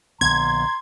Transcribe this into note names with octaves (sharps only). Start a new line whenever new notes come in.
A#1 D3 B3 A#5 C6 G#6